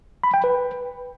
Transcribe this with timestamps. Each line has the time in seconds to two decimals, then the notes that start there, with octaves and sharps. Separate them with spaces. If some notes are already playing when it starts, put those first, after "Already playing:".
0.24 B5
0.34 G5
0.44 B4